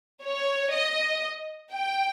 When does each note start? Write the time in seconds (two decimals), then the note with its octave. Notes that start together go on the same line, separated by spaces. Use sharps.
0.24 C#5
0.73 D#5
1.72 G5